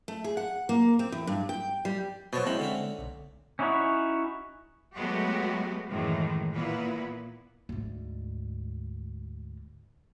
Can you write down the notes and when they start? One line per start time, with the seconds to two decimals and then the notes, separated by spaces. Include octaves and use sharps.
0.08 A3
0.24 G#4
0.37 F#5
0.69 A#3
0.99 C4
1.12 E2
1.27 G2
1.49 G5
1.85 G3
2.33 B2 F#3 C5 C#5 A5
2.47 G#3 C4 C#4 E4
2.59 D3 C#4 E5
2.98 B1
3.59 C#4 D#4 E4 F#4 C#5
4.96 F#3 G#3 A3 B3 F#4 G4
5.90 F#2 A2 D#3 E3 G#3
6.54 A#2 A#3 B3 E4 B4
7.69 D2 G#2